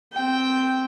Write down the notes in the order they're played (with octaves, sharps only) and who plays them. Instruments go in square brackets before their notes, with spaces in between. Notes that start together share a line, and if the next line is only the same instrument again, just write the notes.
[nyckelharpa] C4 G5